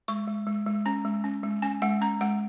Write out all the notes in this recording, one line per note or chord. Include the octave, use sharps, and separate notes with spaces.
G#3 C#6
G#3
G#3
G#3
C#4 A#5
G#3
C#4
G#3
C#4 G#5
G#3 F#5
C#4 A#5
G#3 F#5